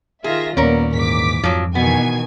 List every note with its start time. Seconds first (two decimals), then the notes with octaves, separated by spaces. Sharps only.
0.24 D#3 F4 G#4 E5 A#6
0.57 D#2 A#2 A#3 B3 C#4 A#4 D5
0.95 G#2 E3 D6 B6
1.43 F2 F3 F#3
1.75 B2 D#3 E3 B3 G#5 G#6